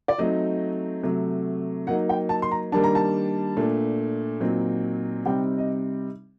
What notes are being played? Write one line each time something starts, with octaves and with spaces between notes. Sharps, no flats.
D5
F#3 A3 C4 D#4 D#5
C3 F#3 A3
F#3 A#3 D#4 F#5
G5
A5
C6
A#5
D#3 G3 A#3 D4 A5
A#5
A5
A#2 A3 D4
A#2 F#3 C4 D#4
C3 G3 C4 D#4 G5
D#5